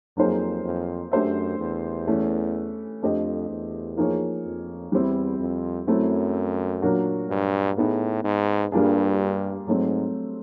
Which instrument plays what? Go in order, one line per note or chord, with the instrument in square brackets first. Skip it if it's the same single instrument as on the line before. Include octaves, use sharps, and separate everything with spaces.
[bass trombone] F2 [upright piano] F#3 A#3 D#4 G#4 C5
[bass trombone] F2
[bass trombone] F#2 [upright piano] A3 D4 G4 C5 E5
[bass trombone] E2
[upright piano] E3 A3 C#4
[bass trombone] F2 [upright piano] A3 D4 G4 C5 D#5
[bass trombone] E2
[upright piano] F3 A#3 D#4 G#4 C#5
[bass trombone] F2
[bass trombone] E2 [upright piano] G3 C4 E4
[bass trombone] F2
[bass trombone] F#2 [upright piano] F#3 A3 C4 E4
[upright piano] A#2 F#3 A#3 D4 F#4
[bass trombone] G2
[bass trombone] A2 [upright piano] B3 D#4 G#4
[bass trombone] G#2
[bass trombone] G2 [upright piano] G3 A#3 D4 F4 G#4
[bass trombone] G#2 [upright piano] F#3 A3 C4